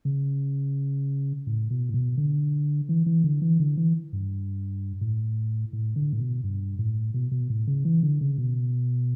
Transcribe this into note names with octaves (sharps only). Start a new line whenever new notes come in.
C#3
A2
B2
A2
B2
D3
E3
E3
D3
E3
D3
E3
G2
A2
A2
D3
A2
B2
G2
A2
B2
B2
A2
C#3
E3
D3
C#3
B2